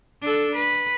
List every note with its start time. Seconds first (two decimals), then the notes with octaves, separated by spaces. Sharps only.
0.21 D4 A4
0.55 B4